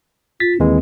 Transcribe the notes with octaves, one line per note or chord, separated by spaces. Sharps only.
F4 A6 B6
D#2 E3 G#3 C4